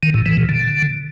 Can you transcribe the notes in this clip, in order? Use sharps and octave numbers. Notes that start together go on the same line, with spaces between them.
D#3
A2
E3
A#2
D3